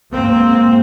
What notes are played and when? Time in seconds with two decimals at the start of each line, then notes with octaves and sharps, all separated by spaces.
0.12 G#2 A#3 C4